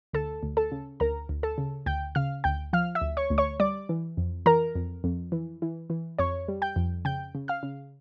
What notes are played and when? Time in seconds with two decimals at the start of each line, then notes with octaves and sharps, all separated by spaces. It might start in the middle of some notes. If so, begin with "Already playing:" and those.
0.13 D2 A4 A5
0.43 D2
0.57 A4 A5
0.72 C#3
1.00 D2 A#4 A#5
1.29 D2
1.43 A4 A5
1.58 C#3
1.86 D2 G5 G6
2.15 C#3 F5 F6
2.44 D2 G5 G6
2.73 F3 F5 F6
2.95 E5 E6
3.02 D2
3.17 C#5 C#6
3.30 D2
3.38 C#5 C#6
3.60 G3 D5 D6
3.89 E3
4.17 F2
4.46 E3 A#4 A#5
4.75 F2
5.04 F2
5.32 E3
5.62 E3
5.90 E3
6.19 F2 C#5 C#6
6.48 G3
6.62 G5 G6
6.76 F2
7.05 C#3 G5 G6
7.35 C#3
7.48 F5 F6
7.63 C#3